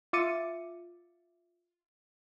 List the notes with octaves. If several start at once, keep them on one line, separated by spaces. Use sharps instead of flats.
F4 E5 D6 A6 C#7 D#7